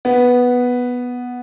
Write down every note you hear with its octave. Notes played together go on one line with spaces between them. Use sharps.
B3